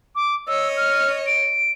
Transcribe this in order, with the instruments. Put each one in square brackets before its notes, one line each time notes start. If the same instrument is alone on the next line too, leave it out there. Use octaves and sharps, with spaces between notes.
[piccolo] D6
[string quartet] C#5 D#5 [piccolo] E6
[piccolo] F6
D7